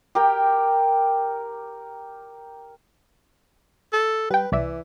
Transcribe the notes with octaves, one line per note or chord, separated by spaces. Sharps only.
G4 A#4 G5
A4
G3 B4 G5
C2 E3 D5 E5